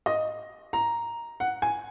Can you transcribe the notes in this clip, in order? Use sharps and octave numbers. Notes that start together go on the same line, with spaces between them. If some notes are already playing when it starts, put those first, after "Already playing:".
D#5
A#5
F#5
G#5